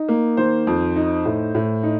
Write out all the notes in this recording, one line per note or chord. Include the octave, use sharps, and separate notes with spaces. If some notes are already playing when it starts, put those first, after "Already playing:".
Already playing: D#4
A#3
D#3 C5
F2
D#4
A2
A2
D#4